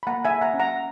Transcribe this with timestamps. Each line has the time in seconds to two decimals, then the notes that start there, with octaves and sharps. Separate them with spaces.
0.03 B5
0.07 A#3 F#5 A#5
0.25 E5 G#5
0.31 A#3
0.41 F#5 A#5
0.54 C#4
0.60 F#5 A#5